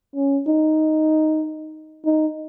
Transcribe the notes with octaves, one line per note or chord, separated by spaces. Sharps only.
C#4
D#4
D#4